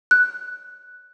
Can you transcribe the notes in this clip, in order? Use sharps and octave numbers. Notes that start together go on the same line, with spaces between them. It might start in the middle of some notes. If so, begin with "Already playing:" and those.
F#6